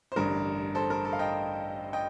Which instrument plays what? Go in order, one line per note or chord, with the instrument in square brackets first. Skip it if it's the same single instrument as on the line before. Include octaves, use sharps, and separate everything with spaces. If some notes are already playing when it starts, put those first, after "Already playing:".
[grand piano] C5
A1 G2 D3 A#4
A4 C5
A#4
A4
F5
D#5 G5
D#5 G5